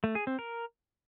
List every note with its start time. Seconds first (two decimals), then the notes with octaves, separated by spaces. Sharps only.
0.04 A3
0.15 G#4
0.27 C4
0.39 A#4